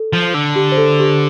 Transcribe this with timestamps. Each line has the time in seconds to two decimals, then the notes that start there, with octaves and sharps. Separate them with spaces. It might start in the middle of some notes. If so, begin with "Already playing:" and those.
Already playing: A4
0.13 F3
0.34 D3
0.56 G4
0.72 C5
0.77 A4
1.00 G4